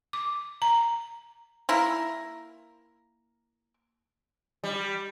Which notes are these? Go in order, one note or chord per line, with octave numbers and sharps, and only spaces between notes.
D6
A#5
A#3 E4 A#4
G3